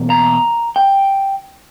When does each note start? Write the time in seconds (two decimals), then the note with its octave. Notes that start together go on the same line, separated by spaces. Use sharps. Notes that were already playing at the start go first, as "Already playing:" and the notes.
Already playing: E2 B2 A#3
0.10 A#5
0.76 G5